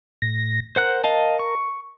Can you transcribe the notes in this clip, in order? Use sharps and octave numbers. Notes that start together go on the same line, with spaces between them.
A2 A#6
A#4 C5 F#5 F#6
D#5 F5 A5
C#6